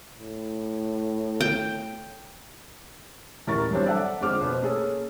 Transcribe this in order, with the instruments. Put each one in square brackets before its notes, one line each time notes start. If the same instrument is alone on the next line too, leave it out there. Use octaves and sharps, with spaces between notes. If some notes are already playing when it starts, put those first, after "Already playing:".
[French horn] A2
[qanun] G5
[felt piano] D#1 E3 A#4 A#5 C#6 A6
E3 F#3 G3 C4 D4
A4 D5 E5 F#5 A5
F2 D3 G#3 C5 D6 F6
B2 B3 C5
A#3 C#4 G#4 A4